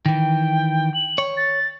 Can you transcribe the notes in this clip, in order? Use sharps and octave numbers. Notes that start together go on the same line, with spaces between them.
D#3 E3 G5
F#7
C#5
A6